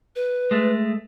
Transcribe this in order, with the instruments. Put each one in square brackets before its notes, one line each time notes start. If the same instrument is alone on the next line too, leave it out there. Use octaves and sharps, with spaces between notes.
[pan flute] B4
[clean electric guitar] G#3 A3